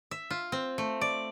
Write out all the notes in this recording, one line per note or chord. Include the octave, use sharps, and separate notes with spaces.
E5
F4
C4
A3
D5